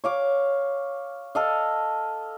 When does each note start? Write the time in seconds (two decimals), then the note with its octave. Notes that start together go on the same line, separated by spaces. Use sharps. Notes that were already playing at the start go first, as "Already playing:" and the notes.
0.04 C#5 F5 D6
1.35 A4 D#5 F5